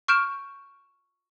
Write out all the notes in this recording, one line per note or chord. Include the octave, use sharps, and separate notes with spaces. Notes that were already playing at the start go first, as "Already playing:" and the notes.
C#6 F6 G6 D7 E7